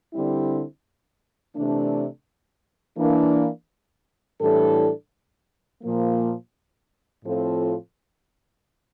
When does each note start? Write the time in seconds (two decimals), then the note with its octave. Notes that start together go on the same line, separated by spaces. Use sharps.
0.12 D3 G3 C4 E4
1.55 C3 E3 A3 D4
2.98 E3 A#3 D4
4.40 A2 E3 G3 D4 A4
5.82 A#2 F3 A#3
7.25 A2 F3 C4 F4 A4